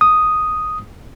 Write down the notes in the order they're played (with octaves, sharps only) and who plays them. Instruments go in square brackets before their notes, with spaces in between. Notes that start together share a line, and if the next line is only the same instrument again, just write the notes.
[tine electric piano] D#6